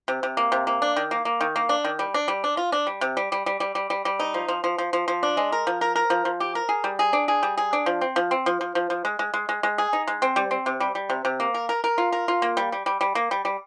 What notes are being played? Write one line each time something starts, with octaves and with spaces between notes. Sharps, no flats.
C3
C3
A#3
C3
A#3
D4
D#3
A#3
A#3
D#3
A#3
D4
D#3
G3
D4
G3
D4
F4
D4
G3
C3
G3
G3
G3
G3
G3
G3
G3
D#4
F3
F3
F3
F3
F3
F3
D4
G#3
A#4
F3
A#4
A#4
F3
F3
G4
A#4
G#4
G3
G#4
D4
G#4
G3
G#4
D4
F3
C4
F3
C4
F3
F3
F3
F3
G#3
G#3
G#3
G#3
G#3
G#4
D#4
G#3
C4
G3
C4
C3
G3
G3
C3
C3
A#3
A#4
A#4
A#4
F4
A#4
F4
A#3
G3
G3
G3
G3
A#3
G3
G3